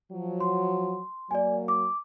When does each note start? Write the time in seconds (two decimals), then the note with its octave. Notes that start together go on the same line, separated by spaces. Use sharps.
0.11 F3 F#3
0.40 C6
1.31 F#3 A#3 D5 G#5
1.68 D6